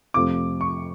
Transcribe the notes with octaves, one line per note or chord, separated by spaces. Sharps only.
F2 C3 F3 A3 D6
C#6